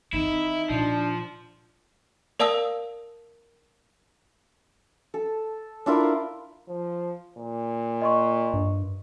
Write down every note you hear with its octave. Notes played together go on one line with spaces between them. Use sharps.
E3 C4 D#4 E4
A#2 F3 D4
A#4 D5 F5 A5 D#6 E6
A4
D4 E4 F4 A#4
F3
A#2
D#5 C6 C#6
G2